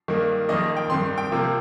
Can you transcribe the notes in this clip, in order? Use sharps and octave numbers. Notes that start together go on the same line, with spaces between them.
G2 D#3 A#3
F2 D#3 A#3 D#5
G5
G2 D#3 C4 C6
G5
C3 F3 A#3